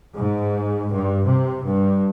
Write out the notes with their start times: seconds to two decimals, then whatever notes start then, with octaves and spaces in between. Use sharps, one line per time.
0.16 G#2
0.91 G2
1.25 C3
1.65 G2